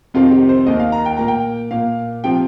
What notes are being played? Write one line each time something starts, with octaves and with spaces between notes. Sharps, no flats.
F2 C3 D#3 C4 F4
G4
C5
D#2 D#3 A#3 D#5
F5
A#5
G5
A#2 A#3 A#5
G5
A#2 A#3 F5
C3 F3 G5